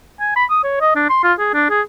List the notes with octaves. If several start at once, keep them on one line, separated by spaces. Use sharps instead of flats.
G#5
B5
D#6
C#5
D#5
D4
C6
F4
G#4
D4
G#4